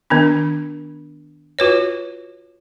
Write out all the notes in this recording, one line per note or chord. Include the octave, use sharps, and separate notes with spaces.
D#3 B3 D4
F4 F#4 B4 C#5